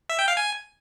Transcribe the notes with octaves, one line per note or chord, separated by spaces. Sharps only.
E5
G5
F5
G#5